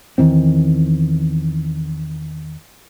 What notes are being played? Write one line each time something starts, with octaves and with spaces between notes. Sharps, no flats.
E2 D#3 E3 C4